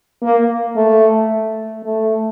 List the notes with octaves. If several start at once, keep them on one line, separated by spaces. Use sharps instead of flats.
A#3
A3
A3